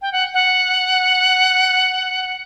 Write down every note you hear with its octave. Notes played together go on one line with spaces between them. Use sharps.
G5
F#5
F#5